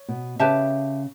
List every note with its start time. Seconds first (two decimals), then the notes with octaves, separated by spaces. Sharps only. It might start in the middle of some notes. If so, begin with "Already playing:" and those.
Already playing: C#5
0.08 B2
0.39 C#3 G4 B4 E5 A5